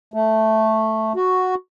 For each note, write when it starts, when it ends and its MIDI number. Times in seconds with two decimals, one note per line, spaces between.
0.14 1.13 57
1.16 1.55 66